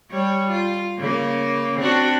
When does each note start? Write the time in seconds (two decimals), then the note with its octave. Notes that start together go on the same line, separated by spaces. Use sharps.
0.10 G3 C#5
0.50 F4
0.98 C#3 A#3
1.79 C4 D4 F#4